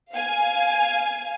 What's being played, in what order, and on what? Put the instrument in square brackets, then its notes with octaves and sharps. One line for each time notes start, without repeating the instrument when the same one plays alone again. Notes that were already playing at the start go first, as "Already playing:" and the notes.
[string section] F5 G#5